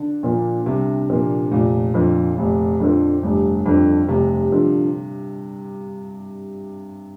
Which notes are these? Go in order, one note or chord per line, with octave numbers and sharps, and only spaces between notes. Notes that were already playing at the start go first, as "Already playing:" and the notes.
Already playing: D3
A#2 F3 A#3
C2 C3
A#2 F3 A#3
F1 A#2
F2 D3 F3
F1
F2 D3 F3
F1 G2
F2 D3 F3
F1 C3
D3 F3